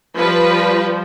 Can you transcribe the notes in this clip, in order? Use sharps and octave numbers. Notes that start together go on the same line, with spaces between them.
F3 G3 B4